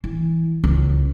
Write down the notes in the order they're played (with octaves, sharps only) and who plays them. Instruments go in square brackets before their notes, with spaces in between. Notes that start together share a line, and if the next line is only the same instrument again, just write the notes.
[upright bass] E3
C#2